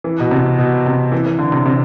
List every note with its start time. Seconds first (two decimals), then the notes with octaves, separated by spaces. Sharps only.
0.04 E3
0.20 B2
0.31 C3
0.59 B2
0.86 C3
1.12 E3
1.26 E3
1.39 D3
1.52 C3
1.66 C3